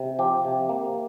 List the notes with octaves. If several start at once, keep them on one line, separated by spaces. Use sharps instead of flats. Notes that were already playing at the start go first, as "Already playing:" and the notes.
Already playing: C3
F3 G4
C3
A#3